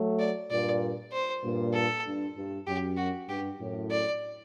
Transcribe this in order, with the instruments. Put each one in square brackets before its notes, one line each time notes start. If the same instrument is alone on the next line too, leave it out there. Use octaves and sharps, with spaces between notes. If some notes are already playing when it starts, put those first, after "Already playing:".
Already playing: [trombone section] F#3 A3
[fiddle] D5
[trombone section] G2 A#2 [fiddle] D5
[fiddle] C5
[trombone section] G2 A#2
[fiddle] A4
[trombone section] G2
G2
[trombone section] F#2 [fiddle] G4
[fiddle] F#4
[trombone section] G2 [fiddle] G4
[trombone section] F#2 A2
[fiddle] D5